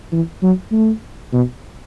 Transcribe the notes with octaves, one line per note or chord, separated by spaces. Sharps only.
E3
F#3
A3
B2